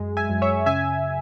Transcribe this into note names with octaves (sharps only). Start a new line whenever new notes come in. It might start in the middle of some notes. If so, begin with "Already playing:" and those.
Already playing: F#2 G#3
E5 G#5
F#2
C#5 E5
C#3 E5 G#5